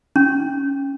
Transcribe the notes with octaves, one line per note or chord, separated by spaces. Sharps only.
C#4